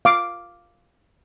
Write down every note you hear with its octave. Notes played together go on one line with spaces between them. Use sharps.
F5 D6